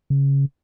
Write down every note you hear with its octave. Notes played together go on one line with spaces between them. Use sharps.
C#3